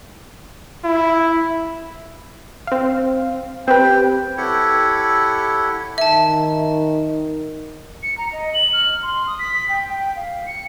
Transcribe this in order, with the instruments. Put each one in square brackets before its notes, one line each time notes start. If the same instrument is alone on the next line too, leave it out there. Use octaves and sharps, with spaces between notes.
[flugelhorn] E4
[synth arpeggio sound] C4 F5
[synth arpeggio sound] C4 G4 B4 [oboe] G5
[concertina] E4 G4 A4 C#5 F#5
[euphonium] D#3 [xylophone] E5 A5
[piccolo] C#7
A#5
D#5
F#7
F6
C6
D#6
B6
G5
G5
F5
C#7